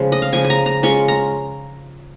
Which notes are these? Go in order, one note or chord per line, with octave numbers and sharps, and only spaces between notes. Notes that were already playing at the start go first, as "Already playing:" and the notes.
Already playing: C#3 F3 G#3
D#5
F5
C#3 F3 G#3 G#5
G#5
A#5
A#5
G#3 C#4 F4 C#6
A#5